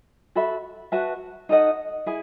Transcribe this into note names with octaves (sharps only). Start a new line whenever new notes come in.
F#4 A4 E5 B5
F#4 B4 E5 A5
D#4 A4 D#5 F#5
E4 G#4